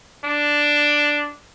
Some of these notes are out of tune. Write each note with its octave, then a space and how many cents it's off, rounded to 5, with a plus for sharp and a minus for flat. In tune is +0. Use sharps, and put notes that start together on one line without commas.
D4 +0